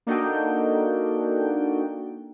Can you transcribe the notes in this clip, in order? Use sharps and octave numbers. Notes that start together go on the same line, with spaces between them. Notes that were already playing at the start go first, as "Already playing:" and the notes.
A#3 D4 D#4 F#4 A4 G5